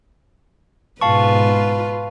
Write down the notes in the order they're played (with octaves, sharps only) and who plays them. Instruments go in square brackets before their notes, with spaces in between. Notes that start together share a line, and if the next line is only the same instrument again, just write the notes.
[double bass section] G#2 B2 [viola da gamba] F4 B4 [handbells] F5 A5 C#6